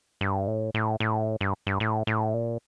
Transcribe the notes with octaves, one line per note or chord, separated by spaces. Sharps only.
G2
A2
A2
A2
G2
G2
A2
A2
A#2